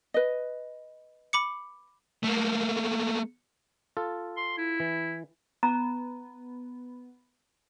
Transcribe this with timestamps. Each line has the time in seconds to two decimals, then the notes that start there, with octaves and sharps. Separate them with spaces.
0.14 B4 D#5
1.33 B5 D6 C#7
2.23 A3 A#3
3.97 F4 A4
4.37 C6
4.58 E4
4.80 E3
5.63 B3 A#5